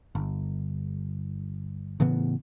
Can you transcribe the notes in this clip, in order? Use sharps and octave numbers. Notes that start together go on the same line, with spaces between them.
G1
A2 C#3 E3 B3